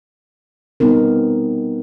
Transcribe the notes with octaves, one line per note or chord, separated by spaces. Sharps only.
G3 B3 C4 D#4 A#4